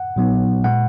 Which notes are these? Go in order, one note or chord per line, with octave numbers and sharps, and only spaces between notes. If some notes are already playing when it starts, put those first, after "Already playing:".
Already playing: F#5
A#1 A#2 F#3 B3 D#4
A#2 G#3 F#5